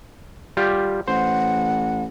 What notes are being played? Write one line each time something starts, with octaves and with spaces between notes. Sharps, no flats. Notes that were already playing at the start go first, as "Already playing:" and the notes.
G3 F4 G4
A1 C5 F#5